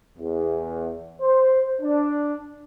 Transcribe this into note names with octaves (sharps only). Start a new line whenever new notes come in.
E2
C5
D4